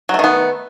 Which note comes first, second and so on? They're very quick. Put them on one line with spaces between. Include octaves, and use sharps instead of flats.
F#3 A3 D#3 B3